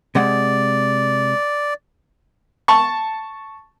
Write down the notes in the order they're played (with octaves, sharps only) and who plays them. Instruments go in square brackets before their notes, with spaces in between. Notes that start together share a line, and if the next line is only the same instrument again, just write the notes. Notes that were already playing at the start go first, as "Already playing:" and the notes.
[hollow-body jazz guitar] C3 G#3 F#5 [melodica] D5
[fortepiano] A5 C#6